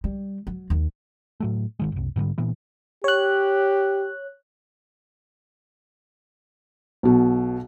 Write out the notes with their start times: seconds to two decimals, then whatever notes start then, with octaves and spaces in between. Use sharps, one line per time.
0.04 G3
0.47 F#3
0.70 D#2
1.40 A2 F#3 A3
1.79 G#1 D#3 G#3
1.92 F#1 C2
2.16 G#2 D3 F3 G3
2.38 A#2 E3 B3
3.04 G4 C#5 F#6
7.03 B1 B2